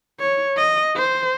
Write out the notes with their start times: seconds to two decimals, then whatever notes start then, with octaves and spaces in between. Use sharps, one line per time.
0.20 C#5
0.57 D#5
0.96 C5